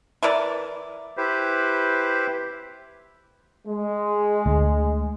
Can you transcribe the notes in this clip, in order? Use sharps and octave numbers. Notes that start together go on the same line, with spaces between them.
E3 E4 A#4 D5
E4 G4 B4 C5
G#3
D2